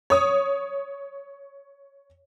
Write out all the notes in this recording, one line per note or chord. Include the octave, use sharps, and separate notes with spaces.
C#5 D#6